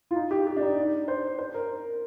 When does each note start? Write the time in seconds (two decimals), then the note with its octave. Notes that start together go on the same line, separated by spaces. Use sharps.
0.11 F4
0.16 D#4
0.31 G4
0.47 G4
0.56 D4
0.62 D#4
1.08 C5
1.39 C5
1.54 A#4